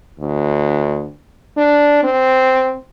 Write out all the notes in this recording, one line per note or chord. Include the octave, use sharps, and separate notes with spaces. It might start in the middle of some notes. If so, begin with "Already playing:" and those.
D2
D4
C4